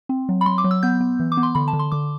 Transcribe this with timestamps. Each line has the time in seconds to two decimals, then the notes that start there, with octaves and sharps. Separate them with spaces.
0.09 C4
0.29 F#3
0.41 B5
0.46 F#3 C6
0.58 D6
0.64 F#3
0.71 E6
0.83 B3 G6
1.01 B3
1.20 E3
1.32 D6
1.37 B3
1.43 C6
1.55 D3 B5
1.68 A5
1.73 D3
1.79 C6
1.92 D3 D6